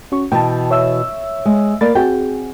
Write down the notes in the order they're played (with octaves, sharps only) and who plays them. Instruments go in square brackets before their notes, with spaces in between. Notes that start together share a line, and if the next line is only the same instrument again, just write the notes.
[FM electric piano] C#4 F#4 C#6
[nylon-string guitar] B2 E3 [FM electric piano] G5 A5
[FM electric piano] C#5 E5 E6
[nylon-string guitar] G#3
[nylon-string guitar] A#3 D5 [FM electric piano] B5 A6
[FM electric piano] C4 F#4 G#4 [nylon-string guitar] G5